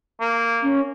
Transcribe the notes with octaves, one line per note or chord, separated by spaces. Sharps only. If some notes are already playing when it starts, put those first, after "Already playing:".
A#3
C#4